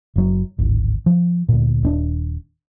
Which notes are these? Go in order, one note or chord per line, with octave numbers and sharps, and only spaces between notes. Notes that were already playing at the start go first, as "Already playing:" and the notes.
F#1 F#3
D1 G#1
F3
D2 A#2
D#1 C4 D4